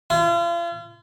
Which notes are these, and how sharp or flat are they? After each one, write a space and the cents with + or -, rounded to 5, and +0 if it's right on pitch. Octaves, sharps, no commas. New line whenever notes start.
F4 -40